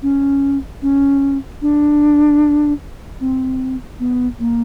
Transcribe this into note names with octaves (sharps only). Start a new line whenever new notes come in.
C#4
C#4
D4
C4
B3
A#3